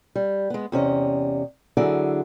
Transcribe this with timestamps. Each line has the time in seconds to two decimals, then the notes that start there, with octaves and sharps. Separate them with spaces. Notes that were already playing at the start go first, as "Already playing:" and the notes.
0.15 G3
0.50 G#3 B3
0.72 E2 C3 C#4 D#5
1.77 D3 F#3 E4 G#4 D5